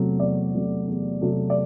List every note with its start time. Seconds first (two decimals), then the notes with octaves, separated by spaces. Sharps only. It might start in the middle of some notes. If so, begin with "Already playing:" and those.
Already playing: E2 C3 F#3 A3
0.20 E2 D5
0.53 C3 F#3 A3
0.87 E2
1.21 C3 F#3 A3
1.50 D5